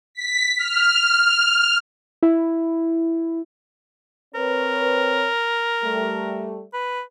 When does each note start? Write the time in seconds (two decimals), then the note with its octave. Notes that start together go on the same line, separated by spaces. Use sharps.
0.14 B6
0.57 F6
2.23 E4
4.35 C4 A#4 B4 C#5
5.83 G3 A3
6.73 B4